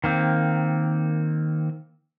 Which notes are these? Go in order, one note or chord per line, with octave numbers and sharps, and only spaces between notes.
D#3 A#3 C4